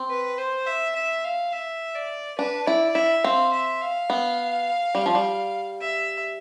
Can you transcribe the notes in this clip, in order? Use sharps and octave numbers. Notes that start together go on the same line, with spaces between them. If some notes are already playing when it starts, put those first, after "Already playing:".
Already playing: C4
B4
C5
E5
E5
F5
E5
D5
D4 B4
E4 D5
E4 E5
C4 F5
E5
F5
B3
G3
F3
G3
E5